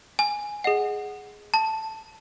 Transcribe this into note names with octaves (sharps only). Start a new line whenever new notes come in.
G#5
G#4 D#5 F#5
A5